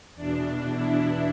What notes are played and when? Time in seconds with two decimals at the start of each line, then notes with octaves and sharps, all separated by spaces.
0.15 E2 B2 D4
0.69 E4